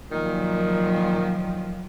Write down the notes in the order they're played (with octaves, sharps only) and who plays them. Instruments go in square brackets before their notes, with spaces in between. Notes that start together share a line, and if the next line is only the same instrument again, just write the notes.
[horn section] A#2 D#3 [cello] F3 F#3